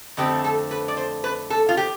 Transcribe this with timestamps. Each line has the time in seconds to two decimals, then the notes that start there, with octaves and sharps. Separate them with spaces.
0.17 F2 D3 A3 C4 G4
0.44 A4
0.71 B4
0.88 D5
0.97 C5
1.24 B4
1.50 A4
1.69 F4
1.77 G4